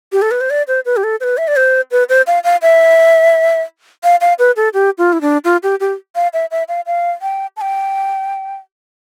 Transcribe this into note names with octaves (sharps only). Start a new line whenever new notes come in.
G4
A4
B4
C5
D5
C5
B4
G4
A4
C5
B4
E5
D5
C5
B4
C5
F5
F5
E5
F5
F5
B4
A4
G4
F4
E4
D4
F4
G4
G4
F5
E5
E5
F5
F5
G5
A5
G5